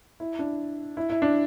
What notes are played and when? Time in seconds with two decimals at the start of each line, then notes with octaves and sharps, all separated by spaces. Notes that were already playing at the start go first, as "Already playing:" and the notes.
0.20 E4
0.39 D4
0.97 E4
1.10 E4
1.22 D4